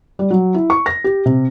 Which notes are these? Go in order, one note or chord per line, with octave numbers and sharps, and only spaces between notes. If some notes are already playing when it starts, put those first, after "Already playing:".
G3
F#3
E4
C#6
A#6
G4
C3